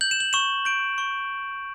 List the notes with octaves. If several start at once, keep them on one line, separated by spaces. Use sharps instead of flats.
G6 F#7
E7
F#7
C#6 E7
G6 D7
C#6